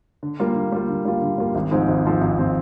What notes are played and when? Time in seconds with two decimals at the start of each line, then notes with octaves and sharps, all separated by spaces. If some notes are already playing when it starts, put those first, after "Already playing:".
0.23 D3
0.40 G3 A#3 F4
0.56 D3
0.72 G3 A#3 F4
0.89 D3
1.05 G3 A#3 F4
1.22 D3
1.38 G3 A#3 F4
1.55 G#1
1.71 G#2 F3 C4
1.88 G#1
2.05 G#2 F3 C4
2.21 G#1
2.39 F3 C4